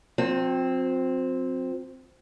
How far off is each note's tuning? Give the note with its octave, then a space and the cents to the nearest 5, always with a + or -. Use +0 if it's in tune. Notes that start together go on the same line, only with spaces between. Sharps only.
F3 +45 C4 +0